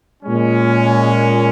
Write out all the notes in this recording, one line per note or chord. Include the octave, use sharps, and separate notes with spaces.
A#2 G#3 C#4